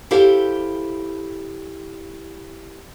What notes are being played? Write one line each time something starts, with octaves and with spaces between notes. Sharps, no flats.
E4 G4 A4 C5 F5